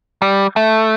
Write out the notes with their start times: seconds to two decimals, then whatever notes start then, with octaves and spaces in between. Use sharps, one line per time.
0.22 G3
0.56 A3